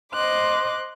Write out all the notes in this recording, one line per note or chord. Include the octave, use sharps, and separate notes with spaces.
C5 D#5 C6 D6 F#6